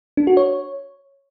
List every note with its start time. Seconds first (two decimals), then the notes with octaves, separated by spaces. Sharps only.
0.17 D4
0.27 F#4
0.37 C#5